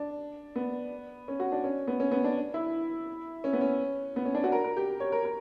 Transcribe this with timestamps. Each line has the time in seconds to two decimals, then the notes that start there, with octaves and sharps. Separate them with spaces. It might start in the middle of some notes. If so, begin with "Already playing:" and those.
Already playing: D4
0.56 B3
1.28 C#4
1.40 F#4
1.52 D4
1.64 C#4
1.87 B3
2.00 C#4
2.11 B3
2.24 D4
2.54 E4
3.44 C#4
3.53 B3
3.61 C#4
4.16 B3
4.25 C#4
4.34 D4
4.44 F#4
4.52 A#4
4.64 A#4
4.77 G4
5.00 C#5
5.12 A#4
5.25 A#4